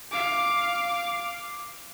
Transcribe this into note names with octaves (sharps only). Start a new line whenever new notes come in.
F5 D6